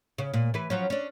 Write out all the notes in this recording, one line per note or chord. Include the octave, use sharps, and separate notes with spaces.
C#3
A#2
E3 B4
F3 F#3 C#4
C#4 D4